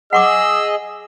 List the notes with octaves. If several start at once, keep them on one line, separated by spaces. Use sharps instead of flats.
G#4 D#5 F#5 C#6 D6 E6